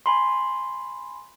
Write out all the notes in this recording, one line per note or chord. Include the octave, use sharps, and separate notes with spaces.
G#5 B5 C6